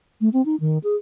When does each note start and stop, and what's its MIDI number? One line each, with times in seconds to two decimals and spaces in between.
0.21 0.29 57
0.33 0.44 60
0.45 0.56 63
0.60 0.78 51
0.84 0.95 68